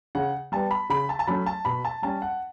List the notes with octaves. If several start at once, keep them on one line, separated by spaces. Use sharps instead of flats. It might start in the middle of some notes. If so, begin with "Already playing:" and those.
C#3 F#5
G3 B3 A5
B5
C#3 B5
A5
A5
F#3 A3 C#4 B5
A5
B2 B5
A5
G3 C#4 A5
F#5